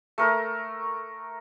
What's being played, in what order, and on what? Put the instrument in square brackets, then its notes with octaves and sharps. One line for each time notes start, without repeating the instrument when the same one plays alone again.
[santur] A3 A#4